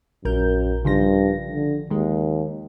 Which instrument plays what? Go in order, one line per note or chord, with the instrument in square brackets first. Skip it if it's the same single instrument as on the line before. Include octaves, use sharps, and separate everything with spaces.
[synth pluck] A#1 A#4 G6 [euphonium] F#2
[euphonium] G2 [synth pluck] C#3 F3 A#6
[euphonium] D3
[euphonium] D#2 [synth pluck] D#3 G#3